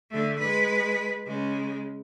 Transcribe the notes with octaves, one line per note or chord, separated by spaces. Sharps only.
D3 A3
G#3 B4
C#3 G#3